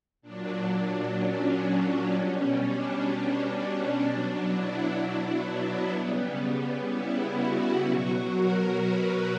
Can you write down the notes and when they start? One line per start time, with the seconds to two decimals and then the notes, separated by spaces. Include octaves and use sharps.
0.22 A#2 F#3 D4
0.70 D4
1.16 C#4
2.11 B2 G3
2.60 D4
3.55 D4
4.03 B2 F#3
4.49 E4
4.98 D4
5.45 B3
5.93 C#3 G3 B3
6.88 E4
7.36 F#4
7.83 B2 F#3
8.31 A#4
8.78 B4